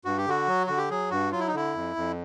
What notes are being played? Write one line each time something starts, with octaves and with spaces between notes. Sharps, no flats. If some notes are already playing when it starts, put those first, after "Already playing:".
G2 F#4
G4
D3 F#4
F#3
D3 F#4
G4
F#3 G#4
G2 F#4
F#3 F4
E4
D#4
D3 E4
F2
F2